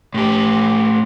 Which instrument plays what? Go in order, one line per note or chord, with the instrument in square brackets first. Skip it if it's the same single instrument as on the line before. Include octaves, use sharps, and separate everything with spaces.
[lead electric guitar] A2 G4